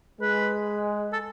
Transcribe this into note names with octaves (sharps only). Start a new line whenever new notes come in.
G#3 B4
A4